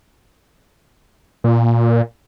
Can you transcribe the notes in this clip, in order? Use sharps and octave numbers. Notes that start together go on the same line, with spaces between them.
A#2